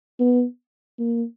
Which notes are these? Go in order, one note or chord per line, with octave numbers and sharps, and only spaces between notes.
B3
A#3